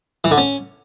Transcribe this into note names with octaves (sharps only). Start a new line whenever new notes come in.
E3
D3
C#4